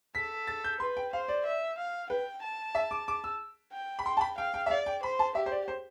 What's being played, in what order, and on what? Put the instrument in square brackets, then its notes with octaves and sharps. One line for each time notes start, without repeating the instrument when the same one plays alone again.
[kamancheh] A4 [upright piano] B6
[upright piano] A6
G6
[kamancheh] B4 [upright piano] C6
[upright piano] G5
[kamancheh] C5 [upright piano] F5
[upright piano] D5
[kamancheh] E5
F5
[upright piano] B4 [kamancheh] G5
[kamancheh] A5
[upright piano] E5
D6
D6
E6
[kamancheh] G5
[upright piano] B5
[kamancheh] G5 [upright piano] C6
[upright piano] A5
B5
[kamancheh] F5 [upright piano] G5
[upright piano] G5
E5
[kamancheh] D5 [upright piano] F5
[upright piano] G5
[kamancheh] C5 [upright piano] B5
[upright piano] A5
[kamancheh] G4 [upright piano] E5
[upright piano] C5
D5
C5